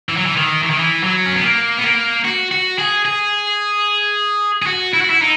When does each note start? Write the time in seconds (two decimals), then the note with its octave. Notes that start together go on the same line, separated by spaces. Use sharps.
0.09 E3
0.17 F#3
0.26 E3
0.37 D#3
0.63 E3
0.70 D#3
0.79 E3
1.03 F#3
1.26 C#4
1.35 B3
1.44 A#3
1.78 B3
1.84 A#3
2.25 F#4
2.51 F#4
2.79 G#4
3.05 G#4
4.62 G#4
4.67 F#4
4.94 E4
5.01 F#4
5.10 E4
5.21 D#4